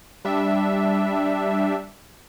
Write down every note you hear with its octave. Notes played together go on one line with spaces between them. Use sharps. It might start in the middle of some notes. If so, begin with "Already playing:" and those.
G3 D4 E5